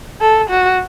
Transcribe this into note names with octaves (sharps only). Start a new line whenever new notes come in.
A4
F#4